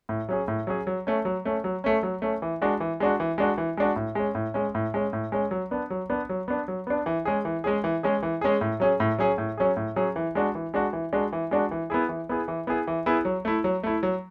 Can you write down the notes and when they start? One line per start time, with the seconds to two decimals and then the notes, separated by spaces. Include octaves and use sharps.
0.09 A2
0.29 F#3 C#4 G#4
0.48 A2
0.67 F#3 C#4 G#4
0.87 F#3
1.07 A3 C#4
1.25 F#3
1.45 A3 C#4
1.64 F#3
1.84 A3 C#4
2.03 F#3
2.22 A3 C#4
2.42 E3
2.62 G#3 D4 F#4
2.80 E3
3.00 G#3 D4 F#4
3.20 E3
3.38 G#3 D4 F#4
3.58 E3
3.77 G#3 D4 F#4
3.96 A2
4.15 G#3 C#4
4.35 A2
4.54 G#3 C#4
4.75 A2
4.94 G#3 C#4
5.13 A2
5.32 G#3 C#4
5.51 F#3
5.71 B3 D4
5.90 F#3
6.10 B3 D4
6.29 F#3
6.48 B3 D4
6.68 F#3
6.87 B3 D4
7.06 E3
7.25 G#3 C#4 G#4
7.45 E3
7.64 G#3 C#4 G#4
7.84 E3
8.03 G#3 C#4 G#4
8.23 E3
8.41 G#3 C#4 G#4
8.61 A2
8.80 F#3 C#4 G#4
9.00 A2
9.19 F#3 C#4 G#4
9.38 A2
9.58 F#3 C#4 G#4
9.77 A2
9.96 F#3 C#4 G#4
10.16 E3
10.35 G#3 D4 F#4
10.55 E3
10.74 G#3 D4 F#4
10.93 E3
11.13 G#3 D4 F#4
11.33 E3
11.51 G#3 D4 F#4
11.71 E3
11.90 B3 E4 G#4
12.09 E3
12.29 B3 E4 G#4
12.48 E3
12.67 B3 E4 G#4
12.87 E3
13.06 B3 E4 G#4
13.25 F#3
13.45 A3 E4
13.64 F#3
13.83 A3 E4
14.03 F#3